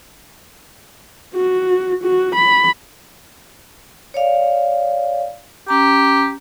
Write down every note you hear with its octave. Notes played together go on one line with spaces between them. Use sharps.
F#4
F#4
B5
C#5 D5 F5
C#4 G4 A#5